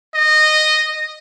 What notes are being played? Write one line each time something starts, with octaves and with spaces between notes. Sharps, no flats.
D#5